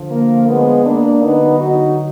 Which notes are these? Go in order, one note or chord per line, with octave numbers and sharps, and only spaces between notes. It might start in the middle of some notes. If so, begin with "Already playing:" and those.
Already playing: D3 F3
A#3
G#3 B3
A#3 D4
D3 F#3 B3 D#4
D#4 F#4